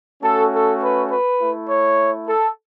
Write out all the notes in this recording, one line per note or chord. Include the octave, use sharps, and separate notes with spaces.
A3 C#4 F#4 A4
A4
B4
B4
A3 E4
C#5
A4